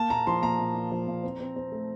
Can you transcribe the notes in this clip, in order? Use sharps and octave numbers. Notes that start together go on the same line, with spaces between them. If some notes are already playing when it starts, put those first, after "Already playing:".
Already playing: A#3 A5
A#2 A#5
F3 C6
A#2 A#5
A#2
A#2
F3
A#2
C4
C4
C4
A3